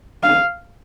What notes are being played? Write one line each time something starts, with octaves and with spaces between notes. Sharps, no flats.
F5